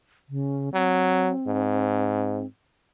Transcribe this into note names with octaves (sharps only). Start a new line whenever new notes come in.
C#3
F#3 C4
G#2